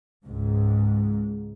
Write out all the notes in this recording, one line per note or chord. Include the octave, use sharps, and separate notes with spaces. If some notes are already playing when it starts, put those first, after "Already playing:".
C#2 G#2